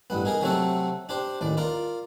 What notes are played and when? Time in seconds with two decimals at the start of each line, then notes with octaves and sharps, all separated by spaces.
0.10 A1 G2 B3
0.25 D#4 G#4 A#4
0.41 C3 F#3 A3 C4 F#4 A4
1.09 D4 G4 C5
1.41 A1 D#2 D5
1.57 F4 A#4 D5